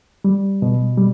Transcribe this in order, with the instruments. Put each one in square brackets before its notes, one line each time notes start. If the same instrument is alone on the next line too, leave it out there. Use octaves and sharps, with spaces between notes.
[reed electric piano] G3
B2
G3